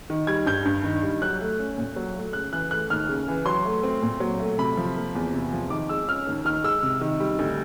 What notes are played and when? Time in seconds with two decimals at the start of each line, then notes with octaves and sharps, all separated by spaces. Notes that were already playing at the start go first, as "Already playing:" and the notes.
0.10 D#3
0.27 G3 G#6
0.46 G2 G6
0.65 G2
0.84 D#3
1.03 G3
1.22 F#3 F#6
1.40 A3
1.59 C#4
1.78 A#2
1.96 F#3
2.15 A3
2.33 C#3 F#6
2.53 E3 F#6
2.71 A3 F#6
2.90 D#2 F6
3.09 C#3
3.28 E3
3.46 F#3 C6
3.65 A3
3.83 C4
4.02 A#2
4.20 F#3
4.40 A3
4.59 C3 B5
4.77 F3
4.96 A#3
5.15 E2
5.34 C3
5.52 F3
5.70 D#3 D6
5.89 G#3 E6
6.08 C#4 F6
6.27 D#2
6.45 D#3 F6
6.64 G#3 E6
6.83 C3
7.01 D#3
7.20 G3
7.39 D2